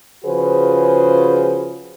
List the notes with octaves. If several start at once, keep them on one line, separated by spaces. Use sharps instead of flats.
C#3 F3 F#4 G#4 B4 C5